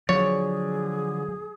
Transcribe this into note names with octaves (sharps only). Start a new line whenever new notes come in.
D3 F3 F#3 G#4 C#5 D5